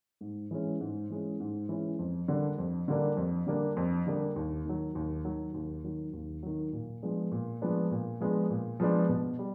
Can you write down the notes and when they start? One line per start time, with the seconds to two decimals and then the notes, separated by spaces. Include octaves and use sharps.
0.21 G#2
0.51 E3 G#3 C#4
0.80 G#2
1.10 E3 G#3 C#4
1.40 G#2
1.69 E3 G#3 C#4
1.99 F2
2.28 D3 G3 A#3 D4
2.58 F2
2.88 D3 G3 A#3 D4
3.17 F2
3.47 D3 G3 A#3 D4
3.77 F2
4.07 D3 G3 A#3 D4
4.36 D#2
4.65 D#3 F#3
4.95 D#2
5.24 D#3 F#3
5.54 D#2
5.84 D#3 F#3
6.13 D#2
6.43 D#3 F#3
6.73 A#2
7.03 F3 G#3 B3 D4
7.32 A#2
7.62 F3 G#3 B3 D4
7.91 A#2
8.20 F3 G#3 B3 D4
8.50 A#2
8.80 F3 G#3 B3 D4
9.09 B2
9.39 G3